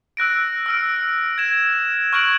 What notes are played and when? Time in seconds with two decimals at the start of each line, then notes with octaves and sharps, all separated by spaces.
0.17 E6 F#6 A#6 D7
0.66 E6 F6 D7
1.38 G#6 E7
2.13 C#6 F6 F#6 G#6 D7 F#7